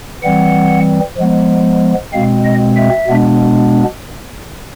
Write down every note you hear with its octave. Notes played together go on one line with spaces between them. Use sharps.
E3 G3 C4 F#5
F3 G#3 B3
B2 G#3 C4 F5
D#5
E5
B2 G#3 B3 D4